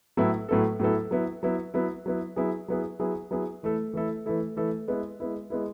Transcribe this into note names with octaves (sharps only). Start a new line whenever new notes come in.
A2 F#3 B3 E4 A4
A2 F#3 B3 E4 A4
A2 F#3 B3 E4 A4
F#3 B3 E4
F#3 B3 E4
F#3 B3 E4
F#3 B3 E4
F#3 B3 E4 G#4
F#3 B3 E4 G#4
F#3 B3 E4 G#4
F#3 B3 E4 G#4
E3 A3 E4 A4
E3 A3 E4 A4
E3 A3 E4 A4
E3 A3 E4 A4
G#3 B3 E4
G#3 B3 E4
G#3 B3 E4